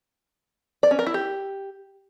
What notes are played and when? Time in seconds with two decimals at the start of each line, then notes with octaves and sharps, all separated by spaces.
0.83 D5
0.91 C#4
0.99 A#4
1.06 E4
1.14 G4